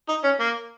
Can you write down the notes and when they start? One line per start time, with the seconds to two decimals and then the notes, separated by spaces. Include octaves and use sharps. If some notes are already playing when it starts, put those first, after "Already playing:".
0.09 D#4
0.24 C#4
0.40 A#3